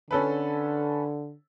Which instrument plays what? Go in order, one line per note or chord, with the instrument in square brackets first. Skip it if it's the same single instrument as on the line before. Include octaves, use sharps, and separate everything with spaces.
[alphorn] D3 [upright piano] C#4 A4 B4